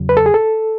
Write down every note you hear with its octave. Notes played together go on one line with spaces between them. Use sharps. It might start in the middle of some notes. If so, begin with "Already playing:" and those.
Already playing: E2 C#3 F#3
B4
A4
G#4
A4